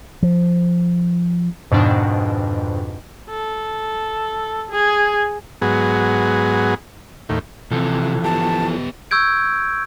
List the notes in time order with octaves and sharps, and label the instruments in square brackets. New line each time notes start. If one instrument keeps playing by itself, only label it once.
[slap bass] F3
[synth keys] F2 G#2 B2 D#3 D4
[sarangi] A4
G#4
[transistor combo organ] G#2 F#3 B3 G#4
D#2 A2
[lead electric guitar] C3 [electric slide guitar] E3 F3 A4
[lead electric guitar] B3 G4 [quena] A5
[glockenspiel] C#6 E6 G6 G#6 D7